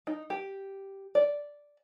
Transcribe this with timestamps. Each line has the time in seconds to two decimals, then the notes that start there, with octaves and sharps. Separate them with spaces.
0.07 D#4
0.30 G4
1.15 D5